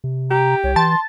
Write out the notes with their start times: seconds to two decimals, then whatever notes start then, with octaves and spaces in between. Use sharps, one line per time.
0.04 C3
0.31 G4 A#5
0.64 C2 C#5
0.76 E3 A5 C6